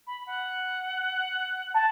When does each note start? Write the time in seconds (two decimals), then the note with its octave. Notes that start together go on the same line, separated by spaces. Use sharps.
0.07 B5
0.27 F#5
1.74 A5